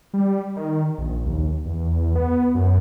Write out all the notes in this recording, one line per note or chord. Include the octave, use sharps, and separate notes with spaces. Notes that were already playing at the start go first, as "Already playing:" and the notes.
G3
D#3
A#1
D#2
E2
E2
B3
F#2